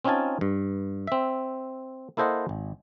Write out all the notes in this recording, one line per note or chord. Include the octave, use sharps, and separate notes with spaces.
C4 C#4 D#4 F4 G#5 A5
G2
C4 E5
A#3 E4 A4 C5 D#5 F#5
G#1